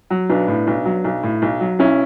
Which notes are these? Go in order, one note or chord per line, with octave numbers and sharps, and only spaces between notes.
F#3
B1 B3 D4
A2
B1
F#3
B1
A2
B1
F#3
B1 C#4 E4